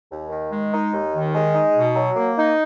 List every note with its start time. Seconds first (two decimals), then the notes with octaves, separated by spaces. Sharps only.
0.09 D#2
0.29 D#3
0.50 G#3
0.71 D#4
0.92 D#2
1.12 D#3
1.33 G#3
1.54 D#4
1.74 B2
1.95 F#3
2.16 A#3
2.36 D#4